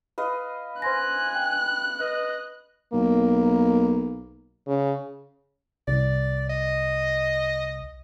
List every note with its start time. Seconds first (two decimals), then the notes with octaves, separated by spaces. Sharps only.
0.18 B4 D#5 F5
0.82 C5 G#5 C6 F#6 A#6
1.35 G5
2.00 B4 D#5
2.93 B1 A#3
4.67 C#3
5.88 C2 D5
6.49 D#5